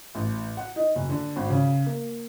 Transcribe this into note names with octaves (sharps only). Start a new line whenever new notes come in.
A1
F#5
D#4
F#1
D3
G#1
C#3
A#3